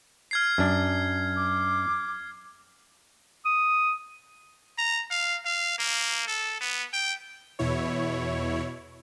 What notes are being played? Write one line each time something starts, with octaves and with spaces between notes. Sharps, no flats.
F6 G#6 C7
F#2 D4
D6
D#6
A#5
F5
F5
A#3
A4
B3
G5
E2 B2 E4 C#5